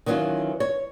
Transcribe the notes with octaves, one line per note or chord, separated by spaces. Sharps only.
D#3 E3 F#3 C#4 F4
C#5